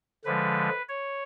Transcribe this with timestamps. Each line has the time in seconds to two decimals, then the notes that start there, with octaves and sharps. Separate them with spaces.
0.25 D3 F3 G#3 B4
0.89 C#5